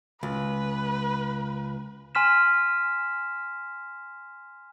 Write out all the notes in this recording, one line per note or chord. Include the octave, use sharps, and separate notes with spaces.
C#2 B4
G#5 C6 F6 B6 E7